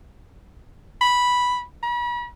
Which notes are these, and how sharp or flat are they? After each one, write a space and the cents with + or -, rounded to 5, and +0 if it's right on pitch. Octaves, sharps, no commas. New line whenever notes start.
B5 -5
B5 -40